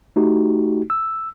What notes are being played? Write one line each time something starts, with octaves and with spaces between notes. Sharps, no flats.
A3 D#4 F#4 G4
E6